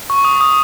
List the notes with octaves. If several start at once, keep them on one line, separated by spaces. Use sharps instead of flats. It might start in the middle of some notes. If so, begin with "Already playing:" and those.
C#6
D#6
D#6